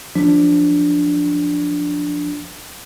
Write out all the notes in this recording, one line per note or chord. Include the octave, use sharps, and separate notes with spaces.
F3 D4